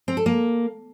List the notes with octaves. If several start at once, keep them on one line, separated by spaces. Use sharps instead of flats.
C4
A4
A#3